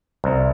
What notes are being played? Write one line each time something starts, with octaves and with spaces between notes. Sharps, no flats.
C2